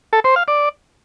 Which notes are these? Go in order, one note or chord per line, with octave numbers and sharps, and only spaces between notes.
A4
C5
F5
D5